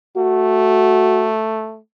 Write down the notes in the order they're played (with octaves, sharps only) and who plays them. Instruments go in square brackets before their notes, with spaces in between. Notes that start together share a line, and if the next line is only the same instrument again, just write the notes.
[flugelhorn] A3 [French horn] F#4